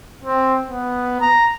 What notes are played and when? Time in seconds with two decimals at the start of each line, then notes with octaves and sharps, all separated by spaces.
0.24 C4
0.69 B3
1.21 A#5